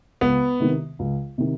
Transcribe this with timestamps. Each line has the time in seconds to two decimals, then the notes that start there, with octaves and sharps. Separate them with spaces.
0.21 C#2 B3
0.60 C3 D#3
0.99 C#2
1.38 C3 D#3